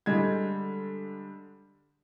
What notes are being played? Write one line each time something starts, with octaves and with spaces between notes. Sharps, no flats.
D3 G3 G#3 G#6